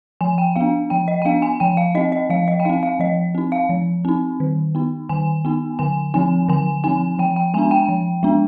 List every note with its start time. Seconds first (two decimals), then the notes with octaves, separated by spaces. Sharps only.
0.21 F3 G#5
0.38 G5
0.56 B3 D4 F5
0.90 F3 G5
1.08 D#5
1.22 G5
1.25 B3 D4 F5
1.42 G#5
1.60 F3 G5
1.77 F5
1.95 C4 D#4 D#5
2.12 D#5
2.30 F3 F5
2.48 D#5
2.60 G5
2.65 C4 D#4 F5
2.83 F5
2.99 F3 D#5
3.35 C4 D#4
3.52 F5
3.69 F3
4.05 C4 D#4
4.40 D#3
4.75 B3 D#4
5.09 D#3 G#5
5.45 B3 D#4
5.79 D3 G#5
6.14 F3 C4 D#4 G#5
6.49 D3 G#5
6.84 F3 C4 D#4 G#5
7.19 F3 G5
7.36 G5
7.54 G#3 B3 D4 G#5
7.71 G5
7.89 F3
8.23 G#3 B3 D4